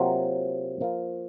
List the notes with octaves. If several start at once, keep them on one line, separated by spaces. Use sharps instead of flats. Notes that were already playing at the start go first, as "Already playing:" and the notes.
Already playing: C3 F#3 A#3 F4
F3 A#3 F4